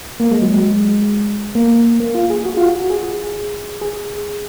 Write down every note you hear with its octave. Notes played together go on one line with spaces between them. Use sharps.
A#3
G#3
F#3
G#3
A#3
A#3
F4
G#4
F#4
F4
F#4
G#4
G#4